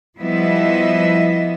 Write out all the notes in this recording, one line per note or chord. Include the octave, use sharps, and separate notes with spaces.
F3 G3 B3 E4 D#5 E5